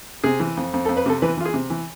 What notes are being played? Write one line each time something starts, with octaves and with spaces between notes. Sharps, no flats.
C3 G#4
E3
F2
F2
A4
F2
B4
C3 A4
E3 B4
E3 F4
G#4
C3
E3